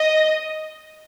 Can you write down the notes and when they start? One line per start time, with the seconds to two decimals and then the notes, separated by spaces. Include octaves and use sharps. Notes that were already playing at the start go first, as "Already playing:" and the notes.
Already playing: D#5